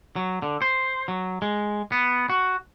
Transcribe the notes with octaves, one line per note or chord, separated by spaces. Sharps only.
F#3
D3
C5
F#3
G#3
B3
F#4